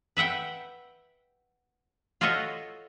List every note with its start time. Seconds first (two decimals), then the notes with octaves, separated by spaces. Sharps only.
0.17 B4 E5 F#5 G5
2.21 F4 F#4 A4 C#5 D#5 E5